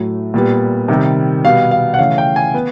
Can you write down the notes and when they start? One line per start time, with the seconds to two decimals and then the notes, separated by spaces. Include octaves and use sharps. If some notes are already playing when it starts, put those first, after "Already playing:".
Already playing: A2 F#3 A3
0.34 A#2 G3 B3
0.88 C3 D#3 G3
1.45 B2 G3 B3 F5
1.71 F5
1.94 F#5
1.99 C#3 E3 A3 C#4 F5
2.18 G5
2.36 G#5
2.54 B3